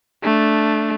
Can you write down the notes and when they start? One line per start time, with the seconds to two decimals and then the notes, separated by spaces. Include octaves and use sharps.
0.23 A3 D4